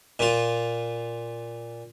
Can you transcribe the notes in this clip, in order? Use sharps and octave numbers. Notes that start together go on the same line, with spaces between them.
A#2 F4